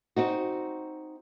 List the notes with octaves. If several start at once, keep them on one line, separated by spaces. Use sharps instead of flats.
C4 D#4 F#4